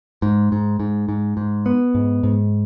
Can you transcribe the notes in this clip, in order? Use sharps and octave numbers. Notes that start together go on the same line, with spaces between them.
G#2
G#2
G#2
G#2
G#2
B3
G#2
G#2